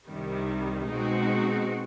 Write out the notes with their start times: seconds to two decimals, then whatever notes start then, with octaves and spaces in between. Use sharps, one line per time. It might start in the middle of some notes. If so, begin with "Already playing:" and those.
0.09 C2 C3 D#3 G3
0.89 B2 G#3 C4 D#4 F#4